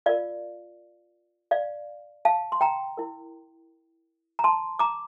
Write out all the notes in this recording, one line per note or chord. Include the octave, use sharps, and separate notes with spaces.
F4 A#4 D5 F5
D5 F5
F5 A5
C6
G5 A#5
E4 A#4
A#5
A5 C6
A#5 D6